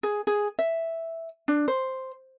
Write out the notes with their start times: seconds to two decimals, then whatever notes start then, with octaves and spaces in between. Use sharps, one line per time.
0.03 G#4
0.27 G#4
0.59 E5
1.48 D4
1.68 C5